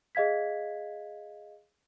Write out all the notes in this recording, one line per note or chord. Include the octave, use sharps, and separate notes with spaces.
G#4 D#5 F5 G#6 B6